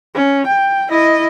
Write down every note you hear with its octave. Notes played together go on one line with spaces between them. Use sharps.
C#4
G5
E4 D#5